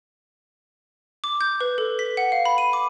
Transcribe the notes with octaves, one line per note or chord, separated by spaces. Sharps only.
D6
G6
B4
A4
B6
F#5
F5
B5
D#7
D6